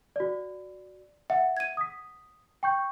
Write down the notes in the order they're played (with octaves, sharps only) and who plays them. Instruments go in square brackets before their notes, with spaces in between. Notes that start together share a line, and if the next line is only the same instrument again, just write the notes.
[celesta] F#4 D5
[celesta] E5 [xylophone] F#5
[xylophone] G#6 D#7
[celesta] D#6 B6
G5 C#6 G6